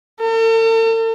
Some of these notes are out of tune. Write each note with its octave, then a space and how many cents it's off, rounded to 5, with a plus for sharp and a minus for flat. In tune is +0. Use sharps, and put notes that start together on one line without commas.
A4 +45